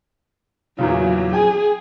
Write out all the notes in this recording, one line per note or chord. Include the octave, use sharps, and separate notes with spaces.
E2 A#2 C#3 F#3
G#4 G5 G#5